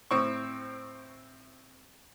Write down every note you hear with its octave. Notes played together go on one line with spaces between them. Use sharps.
A2 C4 C#6